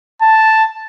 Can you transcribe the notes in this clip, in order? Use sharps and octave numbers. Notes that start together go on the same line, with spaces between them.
A5